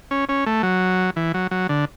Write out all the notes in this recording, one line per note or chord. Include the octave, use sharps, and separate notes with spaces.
C#4
C#4
A3
F#3
E3
F#3
F#3
D3